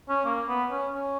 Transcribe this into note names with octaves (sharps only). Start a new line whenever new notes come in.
C#4
A#3
B3
C#4
C#4